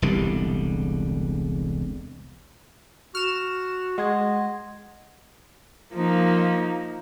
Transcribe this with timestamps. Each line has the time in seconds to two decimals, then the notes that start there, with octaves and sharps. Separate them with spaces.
0.02 E1 C2 D3 G3
3.15 F#4 F6 E7
3.98 G#3 D#5 F#5 C6 G#6
5.93 F3 A#3 D#4